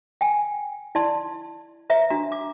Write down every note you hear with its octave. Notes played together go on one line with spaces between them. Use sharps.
G5 G#5
E4 D5 A5 C6
B4 C#5 E5 A#5
D4 F#4 A#5
D6